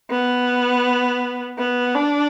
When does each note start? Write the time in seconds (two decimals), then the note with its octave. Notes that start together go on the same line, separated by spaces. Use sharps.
0.11 B3
1.59 B3
1.95 D4